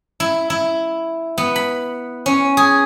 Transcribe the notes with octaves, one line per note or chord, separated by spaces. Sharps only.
E4
E4
B3
B5
C#4
G#4